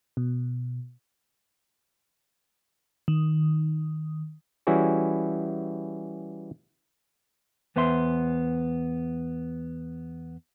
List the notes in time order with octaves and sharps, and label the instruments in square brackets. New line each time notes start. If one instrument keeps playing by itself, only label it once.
[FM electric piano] B2
D#3
[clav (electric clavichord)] E3 G3 C#4 E4 F#4 G#4
[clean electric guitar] E2 B3 C5 E5 C6